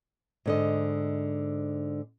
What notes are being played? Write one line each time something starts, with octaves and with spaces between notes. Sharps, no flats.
G#2 D3 D#5